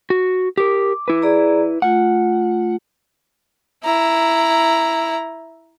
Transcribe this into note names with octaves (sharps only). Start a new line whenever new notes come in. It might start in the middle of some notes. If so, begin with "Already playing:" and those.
F#4
G4 A#4 D6
E4 B4
G#4 D5 A#5
A3 F4 F#5
E4 A#5